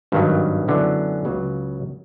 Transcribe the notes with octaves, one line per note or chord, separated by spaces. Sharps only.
G#1 G2 D#3 F#3
F#2 D3 F#3 B3 E4
C#2 C#3 F#3